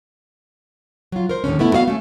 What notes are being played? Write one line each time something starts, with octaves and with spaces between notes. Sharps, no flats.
F#3 F4
A#4 C5
D#2 A2 D3 C#4
A3 B3 E4
B3 F#4 D#5 F5
A3 C#4